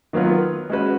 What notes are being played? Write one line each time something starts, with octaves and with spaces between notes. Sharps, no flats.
D#3 F#3 B3 F4 B4
G#3 C#4 F#4 B4